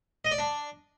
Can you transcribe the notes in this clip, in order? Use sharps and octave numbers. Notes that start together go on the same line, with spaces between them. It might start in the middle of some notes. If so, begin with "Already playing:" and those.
D#5
D5
D4